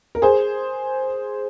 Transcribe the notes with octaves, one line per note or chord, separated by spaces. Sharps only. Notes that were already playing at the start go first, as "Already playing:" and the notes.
A#4
G#4 C5